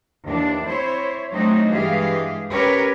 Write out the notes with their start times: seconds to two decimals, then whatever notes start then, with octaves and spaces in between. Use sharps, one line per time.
0.23 D#2 E3 D4
0.66 C4 E4 C5 C#5
1.31 F#3 A3 C4 D4 D#4 F#4
1.71 G2 E3 G#3 G4 G#4 F5
2.49 C#4 G4 A#4 B4 C#5